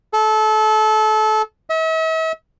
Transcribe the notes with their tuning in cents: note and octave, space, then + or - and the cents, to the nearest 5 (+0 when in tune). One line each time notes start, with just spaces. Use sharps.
A4 -25
E5 -45